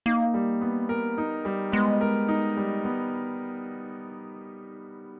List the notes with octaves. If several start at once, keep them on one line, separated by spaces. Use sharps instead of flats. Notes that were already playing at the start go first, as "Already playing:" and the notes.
A#3 D#4
G3
B3
A#4
D#4
G3
G#3 B3
A#4
D#4
G3
B3